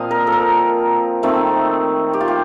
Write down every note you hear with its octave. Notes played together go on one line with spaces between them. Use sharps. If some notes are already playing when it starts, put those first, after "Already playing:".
Already playing: A#2 F3 C4 C5 D#5 F5
A#4
A4
A#4
D#3 A3 C4
G4
F4
G4